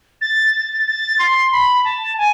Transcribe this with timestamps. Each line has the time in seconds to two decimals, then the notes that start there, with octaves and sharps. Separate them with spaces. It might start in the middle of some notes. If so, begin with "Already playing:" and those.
0.21 A6
0.55 A6
0.87 A6
1.19 C6
1.52 B5
1.85 A5
2.18 G#5